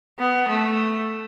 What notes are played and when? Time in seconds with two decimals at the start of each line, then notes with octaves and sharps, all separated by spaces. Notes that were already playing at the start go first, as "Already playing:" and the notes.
0.19 B3
0.48 A3